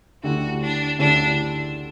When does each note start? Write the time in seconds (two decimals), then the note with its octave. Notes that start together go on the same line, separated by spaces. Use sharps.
0.23 D2 D3 A3 E4 F#4 G4
0.61 D4
0.99 D2 D3 A3 D4 E4 G4